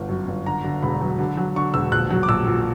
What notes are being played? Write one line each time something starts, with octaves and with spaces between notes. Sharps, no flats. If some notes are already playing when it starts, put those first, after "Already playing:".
Already playing: G1 D3
F#2
G1
D3 A#5
D3
E1 B5
F#3
D3
F#3
D3 C#6
E1 E6
A#1 F#6
F#3
D6
A#1 E6
A#2